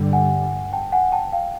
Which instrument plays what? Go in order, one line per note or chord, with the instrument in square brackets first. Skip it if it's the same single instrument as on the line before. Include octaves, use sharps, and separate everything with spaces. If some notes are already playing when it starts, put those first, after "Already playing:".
Already playing: [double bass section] G2 D3 G3
[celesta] F#5 G#5
G5 A5
F#5 G#5
G5 A5
F5 G5